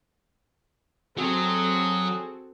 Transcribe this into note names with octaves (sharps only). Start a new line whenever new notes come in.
F#3 C4 F#4 G#4 A4